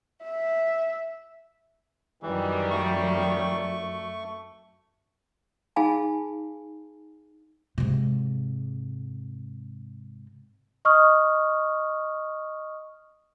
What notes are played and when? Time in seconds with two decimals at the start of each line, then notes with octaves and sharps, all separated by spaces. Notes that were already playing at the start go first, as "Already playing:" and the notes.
0.24 E5
2.23 F#2 D#3 E3 G3
2.71 A3 C#6
5.76 D#4 G#4 F5 G#5 A5 B5
7.78 G#2 C3
10.85 D#5 C#6 D#6 F6